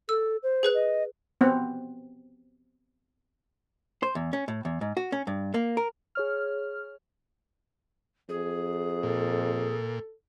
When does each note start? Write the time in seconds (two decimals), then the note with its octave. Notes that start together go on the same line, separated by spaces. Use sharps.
0.09 A4 E6
0.43 C5
0.63 G#4 B4 F#6
0.74 D#5
1.41 B3 C4 F#5
4.03 C5
4.15 E2
4.33 C#4
4.48 A2
4.65 E2
4.81 G#2
4.97 F#4
5.12 C#4
5.27 G2
5.54 A#3
5.77 A#4
6.15 G#4 C#5 F6
8.29 F2 G#4
9.03 A#2 A4